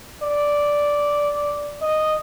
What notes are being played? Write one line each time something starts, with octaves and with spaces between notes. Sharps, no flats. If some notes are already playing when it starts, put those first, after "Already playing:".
D5
D#5